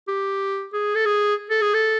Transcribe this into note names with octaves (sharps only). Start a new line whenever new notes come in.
G4
G#4
A4
G#4
A4
G#4
A4